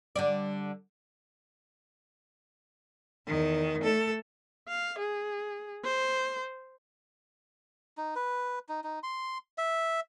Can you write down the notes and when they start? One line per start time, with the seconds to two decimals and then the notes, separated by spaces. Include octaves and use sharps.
0.16 D3 G3 D5
3.26 E2 D#3
3.81 A3 A4
4.69 F5
4.99 G#4
5.84 C5
7.98 D#4
8.16 B4
8.69 D#4
8.84 D#4
9.03 C6
9.58 E5